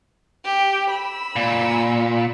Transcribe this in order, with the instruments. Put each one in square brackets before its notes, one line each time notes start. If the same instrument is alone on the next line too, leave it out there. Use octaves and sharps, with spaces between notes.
[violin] G4
B5 E6
[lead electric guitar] A#2